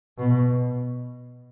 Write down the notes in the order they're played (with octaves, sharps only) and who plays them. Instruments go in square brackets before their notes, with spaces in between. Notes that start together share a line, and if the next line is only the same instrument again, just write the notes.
[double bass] B2